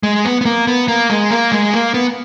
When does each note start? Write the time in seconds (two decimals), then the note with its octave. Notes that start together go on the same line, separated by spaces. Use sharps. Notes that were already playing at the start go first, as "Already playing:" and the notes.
0.03 G#3
0.25 B3
0.41 B3
0.45 A#3
0.67 B3
0.88 A#3
1.10 G#3
1.31 A#3
1.52 G#3
1.73 A#3
1.94 B3